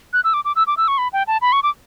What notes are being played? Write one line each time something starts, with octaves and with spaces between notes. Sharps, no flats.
F#6
E6
D6
D6
E6
D6
E6
C#6
B5
G5
A5
B5
C#6
D6